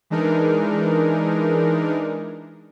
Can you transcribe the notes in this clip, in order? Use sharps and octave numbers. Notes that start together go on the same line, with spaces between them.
E3 G#3 D4 D#4 A#4